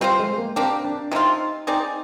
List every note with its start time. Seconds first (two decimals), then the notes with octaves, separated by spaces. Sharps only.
0.01 G3 C4 F4 C5
0.20 G#3
0.38 A#3
0.56 A#3 C4 D4 G4
0.84 D4
1.11 C3 F3 C4 D#4 F4
1.67 C4 D#4 G#4 D5